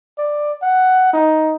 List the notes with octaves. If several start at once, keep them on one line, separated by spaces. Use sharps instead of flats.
D5
F#5
D#4